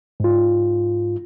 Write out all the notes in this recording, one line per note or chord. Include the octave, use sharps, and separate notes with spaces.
G#2 F4